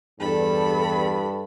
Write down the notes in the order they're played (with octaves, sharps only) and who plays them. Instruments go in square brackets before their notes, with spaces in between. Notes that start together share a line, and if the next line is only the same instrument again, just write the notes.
[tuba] E2 [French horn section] G2 [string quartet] A4 B5